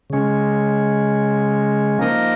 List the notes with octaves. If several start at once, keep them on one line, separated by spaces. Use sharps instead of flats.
C#3 G#3 C#4
F3 A#3 D#4 A#4 D#5